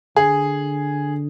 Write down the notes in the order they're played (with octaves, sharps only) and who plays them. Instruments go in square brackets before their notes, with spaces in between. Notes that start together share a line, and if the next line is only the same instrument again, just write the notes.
[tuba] D3 [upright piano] G#4